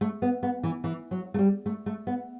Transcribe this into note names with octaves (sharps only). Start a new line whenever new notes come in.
A3
B3
B3
E3
E3
F#3
A3
G3
A3
A3
B3